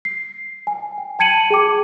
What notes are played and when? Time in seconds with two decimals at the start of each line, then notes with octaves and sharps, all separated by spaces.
0.05 C7
0.67 G#5
0.98 G5
1.19 G5 A5 G#6 C#7 D#7 F#7
1.50 G#4 G5 D6